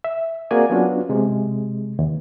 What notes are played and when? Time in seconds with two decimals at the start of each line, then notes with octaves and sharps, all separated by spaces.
0.04 E5
0.51 A#3 C4 F#4 G#4 D5 G#5
0.70 F#3 B3 C#4 D4 F4 F#4
1.09 C3 G#3
1.99 D#2